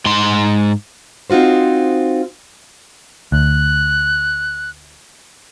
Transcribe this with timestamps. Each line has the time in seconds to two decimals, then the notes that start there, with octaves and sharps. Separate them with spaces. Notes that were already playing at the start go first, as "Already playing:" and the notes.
0.06 G#2 C6
1.30 C4 D#4 F4 F#4 C5
3.32 D2 F#6